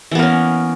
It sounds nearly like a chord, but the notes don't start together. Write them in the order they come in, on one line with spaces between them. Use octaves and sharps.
E3 B3 A#3 C#4